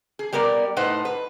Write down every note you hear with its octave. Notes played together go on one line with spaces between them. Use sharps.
G#4
G3 B3 A#4 C#5 D5
A2 D#4 B4 C5 F#5
B4